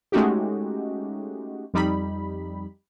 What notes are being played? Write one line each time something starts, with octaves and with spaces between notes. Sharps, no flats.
G#3 A3 C#4 D#4 F#4 G4
F2 G3 D#4 B5